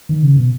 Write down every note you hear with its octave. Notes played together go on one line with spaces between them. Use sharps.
D#3
C#3
B2